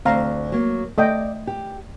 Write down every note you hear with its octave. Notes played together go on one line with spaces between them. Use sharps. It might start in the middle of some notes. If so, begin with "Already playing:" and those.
D2 C4 F5 A#5
F#3 A#3
A3 D5 D#5 G5
G4